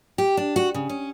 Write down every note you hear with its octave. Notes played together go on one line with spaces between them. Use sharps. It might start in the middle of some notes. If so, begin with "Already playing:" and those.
G4
D4
F#4
C#3
C#4